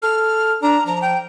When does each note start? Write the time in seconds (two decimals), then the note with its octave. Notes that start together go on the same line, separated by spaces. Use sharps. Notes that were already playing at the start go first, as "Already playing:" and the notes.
0.03 A4 F6
0.63 D4 A#5
0.87 F3 A#5
1.02 G5